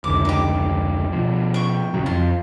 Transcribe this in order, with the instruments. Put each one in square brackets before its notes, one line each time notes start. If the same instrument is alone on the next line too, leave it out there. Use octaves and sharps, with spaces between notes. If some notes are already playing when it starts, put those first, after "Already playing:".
[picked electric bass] F1 C#2 D3 [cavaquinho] D6
[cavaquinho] D#4 G4
[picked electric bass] B2 F3
[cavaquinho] G5 C#6
[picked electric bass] B1 C#3 F#3
[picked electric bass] F2 [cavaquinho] F4